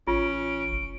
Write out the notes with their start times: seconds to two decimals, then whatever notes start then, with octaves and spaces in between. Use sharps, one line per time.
0.07 A1 C#4 F4 D7
0.71 F1